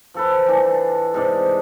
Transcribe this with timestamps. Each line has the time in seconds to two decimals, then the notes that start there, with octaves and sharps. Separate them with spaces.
0.14 F3 A4 B4
0.46 E3 D4
1.14 G#2 C3 D5